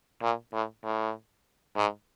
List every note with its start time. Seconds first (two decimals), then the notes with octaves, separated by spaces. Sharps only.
0.22 A#2
0.53 A2
0.84 A2
1.77 G#2